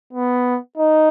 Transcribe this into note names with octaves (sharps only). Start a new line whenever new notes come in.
B3
D#4